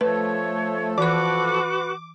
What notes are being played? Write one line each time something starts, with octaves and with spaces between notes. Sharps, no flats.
F3 A3 A4 B4 C#5
E3 F#4 B4 C#6 D6